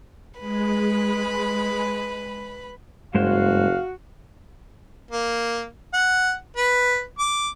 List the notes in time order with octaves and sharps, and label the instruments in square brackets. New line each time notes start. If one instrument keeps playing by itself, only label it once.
[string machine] G#3 [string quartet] B4 B5
[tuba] F#1 [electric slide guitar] G2 G#3 C5 [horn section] F#4 [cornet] F5
[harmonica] A#3
F#5
B4
D6